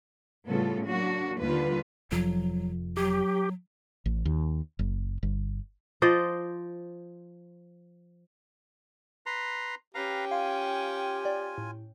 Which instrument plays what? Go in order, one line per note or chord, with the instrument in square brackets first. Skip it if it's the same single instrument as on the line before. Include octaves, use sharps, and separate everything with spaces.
[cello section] A2 C#3 G3 B3 F4 A4
F#3 A#3 D4 F#4
D#2 D3 G3 F4 B4
[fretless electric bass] F1 F2 F3 [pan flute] F#3
[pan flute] F#3 [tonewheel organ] G4
[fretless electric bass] A1
D#2
F#1
G1
[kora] F3 C5 D5 D#5
[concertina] B4 A#5 C6
[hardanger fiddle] C#4 G5 [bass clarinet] G4 [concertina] B4 F5 A#5
[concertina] F4 G#5 [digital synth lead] F5
[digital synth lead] D5
A2